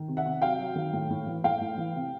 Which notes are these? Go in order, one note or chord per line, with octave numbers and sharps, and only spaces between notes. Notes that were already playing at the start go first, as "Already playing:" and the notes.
Already playing: D#3
C3
E5 F#5
C3
F#3 F5 G5
F#3
D#3
A2
A2
E3
A2 F5 G5
A2
E3
C3